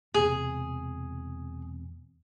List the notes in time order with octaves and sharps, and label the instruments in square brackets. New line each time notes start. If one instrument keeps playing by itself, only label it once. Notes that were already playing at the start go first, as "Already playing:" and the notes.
[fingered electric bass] E1 E2 C3 [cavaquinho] G#4